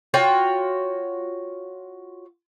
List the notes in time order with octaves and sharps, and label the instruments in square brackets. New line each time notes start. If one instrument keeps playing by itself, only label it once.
[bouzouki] F4 F#4 C#5 G5